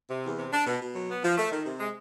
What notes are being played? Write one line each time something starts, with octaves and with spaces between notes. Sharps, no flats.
C3
E2
C3
D4
B2
B2
F#3
B3
F3
A3
D#3
C3
G#3